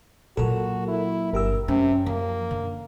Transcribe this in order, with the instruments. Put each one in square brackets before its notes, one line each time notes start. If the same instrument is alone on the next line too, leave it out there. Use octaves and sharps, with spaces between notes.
[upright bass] A#2 F#3 [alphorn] F#4 [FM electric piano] A4 A#4
[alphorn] E4
[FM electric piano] G1 G4 E6 [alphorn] A#4
[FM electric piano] F#2 [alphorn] C3 [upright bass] C#4
[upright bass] F3 [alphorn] A#3
[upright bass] D3